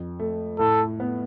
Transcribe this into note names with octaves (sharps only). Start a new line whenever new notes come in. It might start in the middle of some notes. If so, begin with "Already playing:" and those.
Already playing: F2
A3
A2 A4
B3